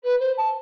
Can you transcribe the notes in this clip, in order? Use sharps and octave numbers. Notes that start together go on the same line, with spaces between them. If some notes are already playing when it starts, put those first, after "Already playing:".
B4
C5
A5